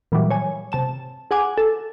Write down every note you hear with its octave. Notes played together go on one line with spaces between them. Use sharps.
A#2 E3 F#3 G3
C#5 G#5
C3 A5 E7
G#4 F#5 G#5 D6
A4